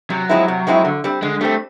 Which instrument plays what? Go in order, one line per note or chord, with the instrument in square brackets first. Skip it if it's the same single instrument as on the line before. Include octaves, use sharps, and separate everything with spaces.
[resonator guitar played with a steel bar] C3 [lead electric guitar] F#3
[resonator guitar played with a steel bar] F3 G#3 C4 E4
C3
F3 G#3 C4 E4
D3
G3 C4
[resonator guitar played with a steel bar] D3 [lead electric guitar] G#3
[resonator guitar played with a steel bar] G3 C4 [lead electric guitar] A3